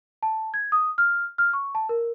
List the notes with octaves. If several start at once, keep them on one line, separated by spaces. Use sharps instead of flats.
A5
G#6
D#6
F6
F6
C#6
A5
A#4